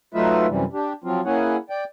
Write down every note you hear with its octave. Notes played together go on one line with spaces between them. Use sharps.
F#3 A3 D#4 F4 B4 E5
F#2 C3 E3 G3
D4 G4
F3 F#3 C4 F4
A#3 C#4 E4 G#4 C#5 F#5
D5 G5